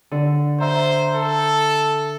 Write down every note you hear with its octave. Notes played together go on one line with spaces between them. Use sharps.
D3
C5 E5 A#5
A4